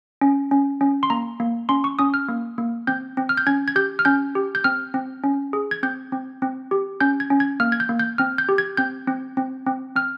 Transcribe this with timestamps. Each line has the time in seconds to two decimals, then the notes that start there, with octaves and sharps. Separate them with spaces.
0.21 C#4
0.51 C#4
0.81 C#4
1.03 C6
1.10 A#3 A#5
1.40 A#3
1.69 C#4 C6
1.84 C#6
1.99 C#4 D#6
2.14 F6
2.28 A#3
2.58 A#3
2.87 C4 G6
3.17 C4
3.29 F6
3.37 G6
3.47 C#4 G#6
3.68 G#6
3.76 G4 G6
3.99 F6
4.05 C#4 G6
4.35 G4
4.55 G6
4.64 C4 F6
4.94 C4
5.24 C#4
5.53 G#4
5.71 G#6
5.83 C4 G6
6.12 C4
6.42 C4
6.71 G4
7.01 C#4 G6
7.20 G#6
7.30 C#4
7.40 G#6
7.60 A#3 F6
7.72 G#6
7.80 G6
7.89 A#3
7.99 G6
8.18 C4 F6
8.38 G6
8.49 G4
8.58 G#6
8.77 C4 G6
9.08 C4
9.37 C4
9.66 C4
9.96 C4 F6